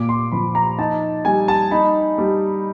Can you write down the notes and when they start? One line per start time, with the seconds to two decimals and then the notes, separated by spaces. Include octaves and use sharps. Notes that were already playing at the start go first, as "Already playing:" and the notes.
Already playing: A#2 D6
0.09 C6
0.32 F3 B5
0.55 A#5
0.78 D#4 A5
1.25 G3 G#5
1.48 A5
1.71 D#4 B5
2.18 G3